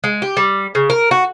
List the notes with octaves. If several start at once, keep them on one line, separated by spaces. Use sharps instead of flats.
G#3
G4
G3
C#3
A#4
F#4